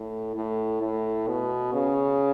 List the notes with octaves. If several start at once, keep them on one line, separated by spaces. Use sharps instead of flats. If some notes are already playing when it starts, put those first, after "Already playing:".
Already playing: A2
A2
A2
B2
C#3